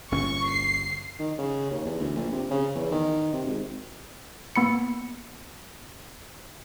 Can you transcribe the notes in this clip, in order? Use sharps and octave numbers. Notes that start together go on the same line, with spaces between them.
G1 A#2 C#4 C#6
C7
D#3
C#3
D#2
E2
D2
A#1
C3
C#3
E2
D#3
C3
G#1
A#3 B3 B5 C#7